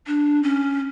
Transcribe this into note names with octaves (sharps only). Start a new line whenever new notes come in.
D4
C#4